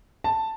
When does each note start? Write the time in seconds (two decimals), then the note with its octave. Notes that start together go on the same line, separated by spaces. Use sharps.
0.24 A5